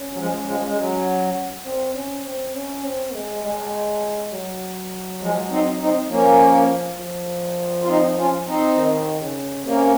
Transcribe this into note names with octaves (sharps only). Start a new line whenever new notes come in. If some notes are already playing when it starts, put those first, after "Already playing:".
Already playing: C#4
F#3
F3 G#3
F3 G#3
G#3
F#3
C4
C#4
C4
C#4
C4
G#3
G#3
F#3
F3 G#3
C4 D#4
C4 D#4
F3 A#3 C#4
F3
F4
C4 D#4
C#4 F4
C4 D#4
D#3
C#3
C3 A#3 C#4